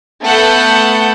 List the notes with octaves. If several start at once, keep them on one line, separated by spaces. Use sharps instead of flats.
A3 B3 A4 F#5 G6